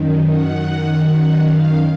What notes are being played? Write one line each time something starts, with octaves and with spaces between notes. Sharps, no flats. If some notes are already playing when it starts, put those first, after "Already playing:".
Already playing: F#2 D#3
F#5
F#5
F5